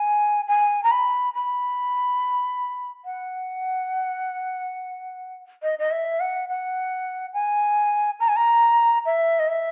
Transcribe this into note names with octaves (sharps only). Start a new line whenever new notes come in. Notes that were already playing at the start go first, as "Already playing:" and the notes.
Already playing: G#5
G#5
A#5
B5
B5
F#5
D#5
D#5
E5
F#5
F#5
G#5
A#5
G#5
A#5
E5
D#5
E5